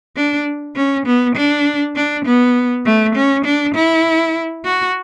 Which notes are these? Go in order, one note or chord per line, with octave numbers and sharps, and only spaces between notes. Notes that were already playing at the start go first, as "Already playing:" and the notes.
D4
C#4
B3
D4
D4
B3
A3
C#4
D4
E4
F#4